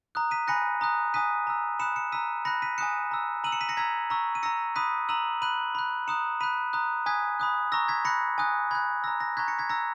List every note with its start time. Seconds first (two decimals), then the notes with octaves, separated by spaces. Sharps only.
0.15 A#5 D#6 F#6
0.31 B6 D#7
0.48 G#5 B5 F#6 A#6 C#7
0.81 A#5 D#6 F#6
1.14 G#5 D#6 F#6 B6 D#7
1.47 A#5 E6
1.80 B5 D#6 F#6 C#7 E7
1.96 C#7 E7
2.12 A#5 E6 B6 D#7
2.45 B5 F#6 A#6 C#7
2.62 B6 D#7
2.78 G#5 D#6 F#6 C#7 E7
3.11 A#5 E6
3.44 A#5 E6 D#7 F#7
3.52 C#7 E7
3.61 B6 D#7
3.69 A#6 C#7
3.77 A#5 E6 G#6 B6
4.10 A#5 C#6 E6
4.35 D#7
4.43 A#5 E6 A#6 C#7
4.76 B5 D#6 F#6 B6 D#7
5.09 A#5 E6 D#7 F#7
5.42 B5 F#6 D#7 F#7
5.75 B5 F#6
6.08 A#5 D#6 F#6 C#7 E7
6.41 B5 F#6 B6 D#7
6.73 A#5 D#6 F#6
7.06 G#5 D#6 F#6 G#6 B6
7.40 B5 D#6 F#6
7.72 A#5 C#6 E6 A#6
7.88 G#6 B6
8.05 B5 F#6 A#6 C#7
8.38 G#5 D#6 F#6
8.71 B5 F#6 G#6
9.04 A#5 E6 A#6
9.20 A#6
9.37 A#5 C#6 F#6 G#6 B6
9.48 A#6 C#7
9.59 G#6 B6
9.69 A#5 E6 A#6 C#7